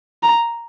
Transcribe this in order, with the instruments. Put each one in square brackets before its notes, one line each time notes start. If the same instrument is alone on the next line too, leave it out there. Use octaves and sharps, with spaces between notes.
[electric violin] A#5